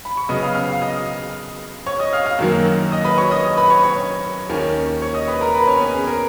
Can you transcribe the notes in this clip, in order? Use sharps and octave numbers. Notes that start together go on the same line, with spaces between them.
B5
C#6
C#3 F#3 B3 D#5 D#6
F5 F6
F5 F6
F5 F6
D#5 D#6
C#5 C#6
D#5 D#6
F5 F6
F5 F6
F#2 D#3 F#3 A#3
D#5 D#6
B4 B5
C#5 C#6
D#5 D#6
B4 B5
C#5 C#6
C#5 C#6
D#2 D#3 A#3 C#4
C#5 C#6
D#5 D#6
B4 B5
A#4 A#5
B4 B5
C#4 C#5
B3 B4
G#4
A#4